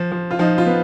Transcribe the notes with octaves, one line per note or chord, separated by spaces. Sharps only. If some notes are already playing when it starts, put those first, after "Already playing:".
Already playing: F3
F3
F4
F3 D#4
F4
B3